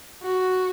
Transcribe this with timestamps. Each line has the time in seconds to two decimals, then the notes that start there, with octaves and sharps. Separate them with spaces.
0.22 F#4